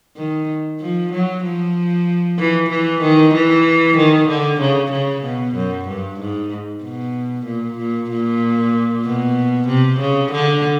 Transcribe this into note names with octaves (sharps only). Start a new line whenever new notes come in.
D#3
F3
F#3
F3
E3
E3
D#3
E3
D#3
D3
C#3
C#3
B2
F#2
G2
G#2
B2
A#2
A#2
A#2
B2
C3
C#3
D3